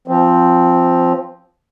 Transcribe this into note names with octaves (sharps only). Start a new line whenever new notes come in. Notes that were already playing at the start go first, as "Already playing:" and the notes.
F3 C4